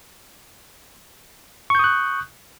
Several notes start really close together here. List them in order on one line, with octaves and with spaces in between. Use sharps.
C#6 G6 D#6 F#6